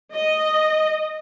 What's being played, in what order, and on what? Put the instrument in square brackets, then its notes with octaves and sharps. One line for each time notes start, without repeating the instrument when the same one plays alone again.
[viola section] D#5